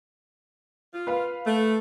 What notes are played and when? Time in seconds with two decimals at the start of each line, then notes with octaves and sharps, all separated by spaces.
0.93 F4
1.07 B4 F5
1.46 A3